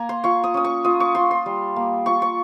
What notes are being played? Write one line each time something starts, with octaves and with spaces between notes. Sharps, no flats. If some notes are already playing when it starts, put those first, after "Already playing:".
Already playing: A#3 G#5 A#5
C6
F4 C#6
D#6
C#4 D#6
C#6
F4 D#6
C#6
F4 C6
C6
G3
A#3
F4 C#6
C#6